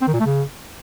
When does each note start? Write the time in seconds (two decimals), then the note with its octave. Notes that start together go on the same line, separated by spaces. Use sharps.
0.01 C4
0.07 D#3
0.13 A#2
0.20 A3
0.26 C#3